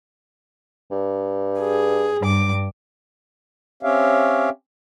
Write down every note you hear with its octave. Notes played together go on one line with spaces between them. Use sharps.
G2
G#4
G2 D6
C4 C#4 G4 C#5 E5 F5